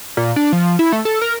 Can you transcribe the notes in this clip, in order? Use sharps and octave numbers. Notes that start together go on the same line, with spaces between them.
A#2
D4
F3
E4
A3
A4
A#4